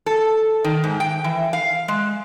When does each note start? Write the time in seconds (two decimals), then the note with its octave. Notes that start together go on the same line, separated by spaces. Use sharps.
0.06 A4
0.64 D#3
0.84 G#2
1.00 G5
1.24 E3
1.53 F5
1.88 G#3